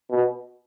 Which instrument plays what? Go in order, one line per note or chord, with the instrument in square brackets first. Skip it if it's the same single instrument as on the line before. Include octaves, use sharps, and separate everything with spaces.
[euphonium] B2